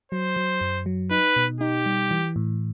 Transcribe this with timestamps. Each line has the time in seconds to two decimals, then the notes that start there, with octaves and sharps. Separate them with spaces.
0.12 F#3 C5
0.36 F#3
0.61 F#2
0.86 F#3
1.11 D#4 B4
1.36 B2
1.60 D#4 G4
1.86 G3
2.11 E3
2.36 A2